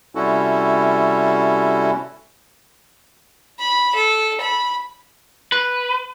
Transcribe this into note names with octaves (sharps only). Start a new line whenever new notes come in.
C3 G3 C#4 E4 F#4 A4
B5
A4
B5
B4